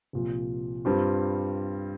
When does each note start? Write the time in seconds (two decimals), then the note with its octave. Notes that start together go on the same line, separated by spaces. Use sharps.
0.13 C2 A#2 F3
0.85 G2 G3 C4 F4